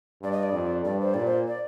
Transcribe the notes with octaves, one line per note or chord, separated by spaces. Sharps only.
G2 D5
D#5
D5
F2
G2 D5
C5
A#2 D5
C5
D5